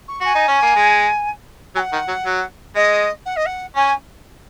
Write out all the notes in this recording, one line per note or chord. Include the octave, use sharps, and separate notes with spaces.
C#6
F#4 G#5
D#4
C#4
A#3
G#3
F#3 G#5
F#5
D#3
F#3
F#3
G#3 D#5
F#5
D#5
F#5
C#4 G#5